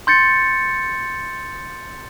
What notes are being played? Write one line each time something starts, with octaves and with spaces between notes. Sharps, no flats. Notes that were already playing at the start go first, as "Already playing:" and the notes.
C6 G6 A6 C#7